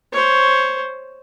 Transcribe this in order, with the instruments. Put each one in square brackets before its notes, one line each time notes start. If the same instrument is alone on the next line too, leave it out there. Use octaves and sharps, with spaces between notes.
[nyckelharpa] C5 C#5